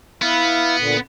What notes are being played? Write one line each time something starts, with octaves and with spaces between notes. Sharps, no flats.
B3 E4 F5
A#2 D3